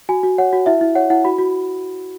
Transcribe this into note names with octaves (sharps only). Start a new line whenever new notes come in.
F#4 G#5
F#4
C#5 F#5
F#4
E4 E5
E4
C#5 F#5
E4 F#5
F#4 B5
F#4